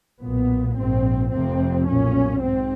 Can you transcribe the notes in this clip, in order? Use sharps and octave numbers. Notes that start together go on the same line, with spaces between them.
B1 A#2 B3
A#1 G#2 C4
F1 F2 C3 C4
B1 A#2 C#4
G#2 C4